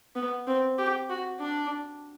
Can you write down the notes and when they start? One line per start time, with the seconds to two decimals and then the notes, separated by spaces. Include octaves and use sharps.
0.16 B3
0.47 C4
0.78 G4
1.10 F#4
1.40 D4